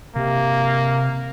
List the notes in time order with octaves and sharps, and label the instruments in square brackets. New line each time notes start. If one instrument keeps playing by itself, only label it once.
[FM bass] C3 [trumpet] A#3